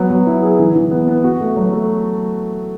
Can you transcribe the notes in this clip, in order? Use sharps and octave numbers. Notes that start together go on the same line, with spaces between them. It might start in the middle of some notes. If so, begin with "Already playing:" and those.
Already playing: F#3 B3
F#3
E4
G#4
E3
E3
B3
B3
F#4
A3
F#3
A3